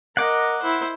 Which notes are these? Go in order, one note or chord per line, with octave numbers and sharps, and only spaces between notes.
A#4 D#5 F#5 D6
E4 C5